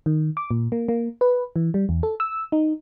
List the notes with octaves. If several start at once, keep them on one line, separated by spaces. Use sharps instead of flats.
D#3
D6
A#2
A#3
A#3
B4
E3
G3
E2
A4
E6
D#4